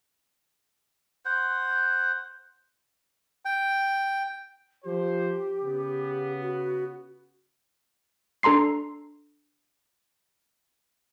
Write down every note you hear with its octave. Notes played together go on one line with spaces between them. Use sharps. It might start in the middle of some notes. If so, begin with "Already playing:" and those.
C5 F#5
G5
F3 G4 C5
C#3 B3
F#4
D4 A4 A#5 C6 C7